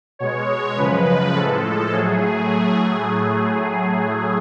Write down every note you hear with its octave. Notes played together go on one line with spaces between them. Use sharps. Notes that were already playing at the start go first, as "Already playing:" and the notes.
B2 G#3 C#5
F#2 C#3 F3 G#3 B4
A2 F3 G#3 A4
A2 F#3 A3 G#4